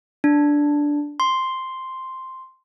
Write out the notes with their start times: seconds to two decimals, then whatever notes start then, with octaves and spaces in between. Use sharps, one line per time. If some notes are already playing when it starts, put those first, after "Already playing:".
0.24 D4
1.20 C6